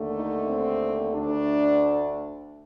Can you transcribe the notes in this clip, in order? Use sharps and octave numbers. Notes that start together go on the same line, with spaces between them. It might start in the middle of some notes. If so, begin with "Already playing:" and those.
Already playing: D#2 D3 A3
D#4
C4
D2 D3 A3 D4